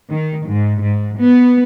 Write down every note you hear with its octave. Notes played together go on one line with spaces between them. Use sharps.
D#3
G#2
G#2
B3